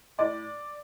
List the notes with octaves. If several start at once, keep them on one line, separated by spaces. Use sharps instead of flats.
A2 D5